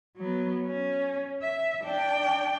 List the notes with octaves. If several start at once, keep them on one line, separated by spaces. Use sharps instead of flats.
F#3 B3
C#4
E5
D4 G5